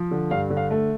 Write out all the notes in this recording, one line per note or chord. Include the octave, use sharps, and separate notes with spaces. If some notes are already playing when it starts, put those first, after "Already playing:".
Already playing: F3
D3
G2 F5
D3
F5
A3